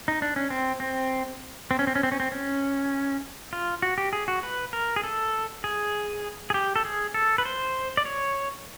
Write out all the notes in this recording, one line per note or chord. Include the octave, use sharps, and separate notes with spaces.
D#4
D4
C#4
C4
C4
C4
C#4
C4
C#4
C4
C#4
C4
C#4
F4
F#4
G4
G#4
F#4
B4
A#4
G#4
A4
G#4
G#4
G4
A4
G#4
A4
B4
C5
D5
C#5